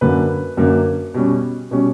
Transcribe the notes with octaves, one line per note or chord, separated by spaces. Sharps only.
F#2 D3 A#3 B4
F#2 D3 A#3
B2 G3 C#4
B2 G3 C#4